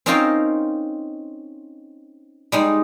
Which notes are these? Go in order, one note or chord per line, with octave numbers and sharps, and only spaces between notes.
C4 C#4 D#4 F4 A#4 C5
G3 G#3 D#4